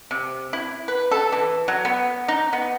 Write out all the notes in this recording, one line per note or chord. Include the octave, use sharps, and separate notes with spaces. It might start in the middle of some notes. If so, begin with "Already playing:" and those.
C3
E4
B4
A4
E3
F#3
B3
D#4
B3